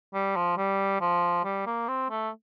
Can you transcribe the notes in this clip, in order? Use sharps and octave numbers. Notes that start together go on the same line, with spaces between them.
G3
F3
G3
F3
G3
A#3
C4
A3